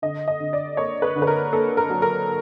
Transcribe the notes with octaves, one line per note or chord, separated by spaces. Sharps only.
D3 D#5
D#5
D3
D5
A#3 C#5
B4
D3
B4
A#4
A#3 A4
A#4
F#3
A#4